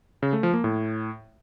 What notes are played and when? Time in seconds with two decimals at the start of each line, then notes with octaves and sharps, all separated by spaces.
0.23 C#3
0.33 A3
0.43 F3
0.54 A#3
0.64 A2